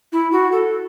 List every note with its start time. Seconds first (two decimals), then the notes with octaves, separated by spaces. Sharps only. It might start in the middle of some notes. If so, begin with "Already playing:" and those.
0.12 E4
0.32 F#4
0.51 A4